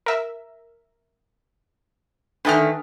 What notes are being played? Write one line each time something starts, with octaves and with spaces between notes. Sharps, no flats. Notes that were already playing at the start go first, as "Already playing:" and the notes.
A#4 E5
D3 D#3 A3 D4 B4 G5 D#6 F6